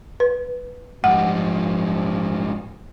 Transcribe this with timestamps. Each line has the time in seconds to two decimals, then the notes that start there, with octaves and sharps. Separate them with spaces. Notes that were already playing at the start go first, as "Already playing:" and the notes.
0.20 B4
1.04 G#2 F3 G3 F#5